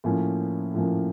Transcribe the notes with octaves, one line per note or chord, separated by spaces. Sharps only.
A2 F3 A#3 C#4
A2 F3 A#3 C#4